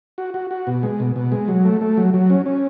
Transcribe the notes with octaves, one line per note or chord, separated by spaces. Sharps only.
F#4
F#4
F#4
B2
G#3
B2
B2
G#3
F#3
A3
A3
F#3
F#3
C#4
C#4